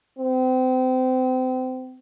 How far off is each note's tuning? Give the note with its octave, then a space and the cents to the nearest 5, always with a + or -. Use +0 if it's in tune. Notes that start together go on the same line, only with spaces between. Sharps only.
C4 -30